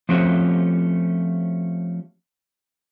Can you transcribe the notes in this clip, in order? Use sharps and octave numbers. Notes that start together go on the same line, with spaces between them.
F3 A3 C4 C#4 F#4 G4